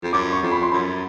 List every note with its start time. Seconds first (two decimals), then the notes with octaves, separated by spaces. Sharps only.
0.03 F2
0.13 F#2 D6
0.32 C#6
0.43 F2
0.52 B5
0.62 C6
0.72 F#2 B5